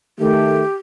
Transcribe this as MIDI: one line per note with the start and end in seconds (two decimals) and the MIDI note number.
0.19 0.63 51
0.19 0.63 57
0.19 0.74 67